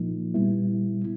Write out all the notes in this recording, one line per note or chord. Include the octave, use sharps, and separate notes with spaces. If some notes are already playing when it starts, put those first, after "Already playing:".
Already playing: A#2 F3 A#3 D#4
A#2 G3 B3 E4